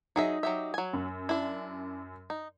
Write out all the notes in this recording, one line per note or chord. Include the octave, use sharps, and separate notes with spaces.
F#3 D#4 G#4 E5
F#3 G4 E5
F#3 G#5
F#2
D4 E4
D#4